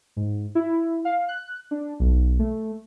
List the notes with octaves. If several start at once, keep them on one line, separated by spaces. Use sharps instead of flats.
G#2
E4
F5
F#6
D4
B1
A3